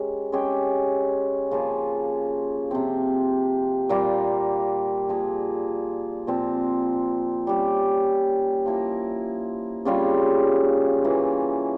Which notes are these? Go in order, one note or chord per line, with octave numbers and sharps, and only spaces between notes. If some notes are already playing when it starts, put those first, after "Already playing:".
Already playing: G#3 C#4 G4 A#4
G#3 C#4 G4
C#3 F3 A#3 F4
C3 F3 C4
A#2 G3 A#3 F4
F3 A#3 F4 G#4
A#2 F3 C4
G3 C#4 G4
F3 A#3 E4 A#4
C#3 G3 C#4 F4
E3 A#3 C#4 F4